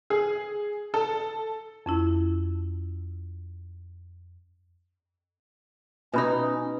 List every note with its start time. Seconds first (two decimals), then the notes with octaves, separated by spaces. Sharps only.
0.10 G#4
0.94 A4
1.86 F2 C#4 E4
6.14 B2 C#4 D#4 B4 B5